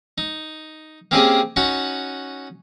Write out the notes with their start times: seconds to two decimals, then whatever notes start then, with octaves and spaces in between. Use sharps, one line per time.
0.18 D#4
1.11 A#3 C4 C#4 G4 G#4 D#5
1.56 C#4 D#4 F#4 F#5 B5